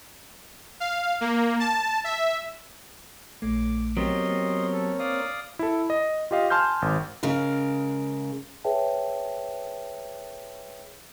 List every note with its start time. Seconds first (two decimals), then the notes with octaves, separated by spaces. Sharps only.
0.80 F5
1.21 A#3
1.60 A5
2.04 E5
3.42 A#1 A3 D6
3.97 F#3 B3 C4 G4 A#4 C#5 D#5 C6
4.30 A#3
4.73 A4
4.99 D5 F5 D#6
5.59 E4 A4
5.90 D#5
6.31 F4 G4 D#5 F5
6.50 G#5 A5 C6 F6 G6
6.82 G#1
7.23 C#3 G#3 A#4
8.64 G#4 B4 C#5 E5 G5 A5